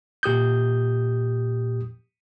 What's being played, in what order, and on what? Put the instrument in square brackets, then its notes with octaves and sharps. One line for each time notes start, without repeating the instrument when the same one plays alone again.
[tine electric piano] A#2 G4 D#6 G6